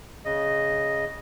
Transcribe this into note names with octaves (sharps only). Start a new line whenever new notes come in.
C#3 D#5